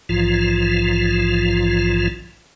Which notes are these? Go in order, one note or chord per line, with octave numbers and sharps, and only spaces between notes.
A#1 G#2 E3 F3 F4